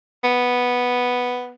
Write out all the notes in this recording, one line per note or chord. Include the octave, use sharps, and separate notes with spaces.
B3